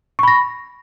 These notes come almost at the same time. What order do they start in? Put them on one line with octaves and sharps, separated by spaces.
C#6 B5 A#6